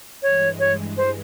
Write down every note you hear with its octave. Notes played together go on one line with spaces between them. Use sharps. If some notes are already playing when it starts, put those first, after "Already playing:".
G2 E3 G#3 C#5
C#5
C5